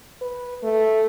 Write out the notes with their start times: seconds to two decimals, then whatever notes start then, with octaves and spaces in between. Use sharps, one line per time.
0.21 B4
0.63 A3